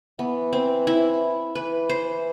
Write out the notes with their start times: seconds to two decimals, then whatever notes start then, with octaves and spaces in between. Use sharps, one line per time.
0.19 E3 B3
0.53 C4
0.87 E4
1.55 E3 B4
1.89 C5